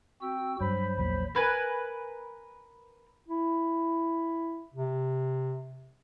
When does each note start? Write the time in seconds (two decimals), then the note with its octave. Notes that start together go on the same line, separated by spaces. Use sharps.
0.21 C4 F#4 G5 E6
0.61 G2 F#3 C5 B5
0.97 A#1 E2 A#2 B5
1.35 A#4 B4 G#5
3.28 E4
4.74 C3